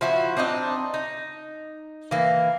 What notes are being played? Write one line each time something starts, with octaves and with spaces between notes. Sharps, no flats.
F3 E4 F#4
C4 D4 D#4 D#5
D#4
E3 A#3